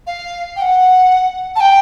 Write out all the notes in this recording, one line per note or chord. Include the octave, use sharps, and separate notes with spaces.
F5
G5
F#5
A5
G5